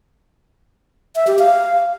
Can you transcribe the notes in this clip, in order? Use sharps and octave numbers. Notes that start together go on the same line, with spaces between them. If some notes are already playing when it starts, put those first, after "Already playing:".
E5
G4
F5